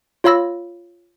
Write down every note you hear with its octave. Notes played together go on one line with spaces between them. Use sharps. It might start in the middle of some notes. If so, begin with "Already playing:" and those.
F4 C#5 F5 B5 E6 A#6